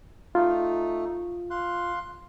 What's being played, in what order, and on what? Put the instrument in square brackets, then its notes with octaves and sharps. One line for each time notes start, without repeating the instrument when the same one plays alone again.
[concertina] A3 D#4 [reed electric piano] F4
[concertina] F5 C6 F#6